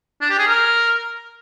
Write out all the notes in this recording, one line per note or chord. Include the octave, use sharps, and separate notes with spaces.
D4
G4
G#4
A#4